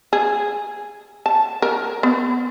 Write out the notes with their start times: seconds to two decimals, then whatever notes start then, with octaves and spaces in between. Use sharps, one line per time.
0.13 G#4
1.26 A5
1.62 A#4
2.03 B3